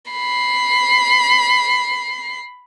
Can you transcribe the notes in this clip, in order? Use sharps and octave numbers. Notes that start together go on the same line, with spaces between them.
B5 C7